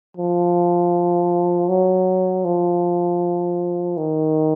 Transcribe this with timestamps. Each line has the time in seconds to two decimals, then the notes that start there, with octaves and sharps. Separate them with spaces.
0.17 F3
1.69 F#3
2.45 F3
3.97 D#3